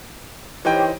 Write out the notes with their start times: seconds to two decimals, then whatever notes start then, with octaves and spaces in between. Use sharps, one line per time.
0.65 E3 D#4 G4 C5 C#5 G5